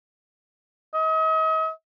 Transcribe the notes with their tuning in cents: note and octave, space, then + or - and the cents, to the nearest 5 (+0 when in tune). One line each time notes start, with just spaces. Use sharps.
D#5 +40